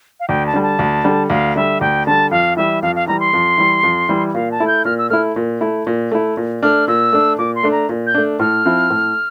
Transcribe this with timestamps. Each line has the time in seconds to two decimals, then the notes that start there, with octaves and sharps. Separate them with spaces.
0.20 F5
0.28 D2 G5
0.46 A5
0.54 D3 G3
0.63 A5
0.79 D2
1.04 D3 G3
1.30 D2 F5
1.56 D3 G3 E5
1.81 D2 G5
2.06 D3 G3 A5
2.31 F2 F5
2.57 E3 G3 E5
2.82 F2 F5
2.96 F5
3.07 E3 G3 A#5
3.20 C6
3.33 F2
3.58 E3 G3
3.83 F2
4.09 E3 G3
4.34 A#2 F5
4.52 A5
4.60 A3 E4
4.68 G6
4.85 A#2 F6
4.98 E6
5.10 A3 E4 F6
5.36 A#2
5.61 A3 E4
5.87 A#2
6.12 A3 E4
6.37 A#2
6.63 A3 D4 F6
6.88 A#2 E6
7.13 A3 D4
7.38 A#2 D6
7.55 C6
7.63 A3 D4
7.72 A#5
7.89 A#2
8.07 G6
8.14 A3 D4
8.40 A2 F6
8.65 F3 C4 E4
8.90 A2